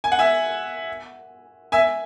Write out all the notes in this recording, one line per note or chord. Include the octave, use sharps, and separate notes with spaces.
G#5
F#5
E5 G#5
E5 G#5